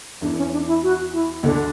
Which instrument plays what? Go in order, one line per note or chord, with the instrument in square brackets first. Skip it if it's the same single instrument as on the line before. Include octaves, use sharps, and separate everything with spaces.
[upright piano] E2 E3 [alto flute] D4
[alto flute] C#4
D4
E4
F#4
E4
[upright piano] D2 D3 [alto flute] D4